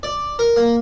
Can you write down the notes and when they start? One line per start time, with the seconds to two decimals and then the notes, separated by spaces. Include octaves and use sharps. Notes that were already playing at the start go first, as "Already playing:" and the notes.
0.03 D5
0.39 A#4
0.56 A#3